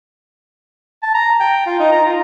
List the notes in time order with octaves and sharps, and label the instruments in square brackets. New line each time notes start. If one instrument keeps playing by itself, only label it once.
[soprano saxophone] A5
A#5
G5
F4
D#4
A#5
F4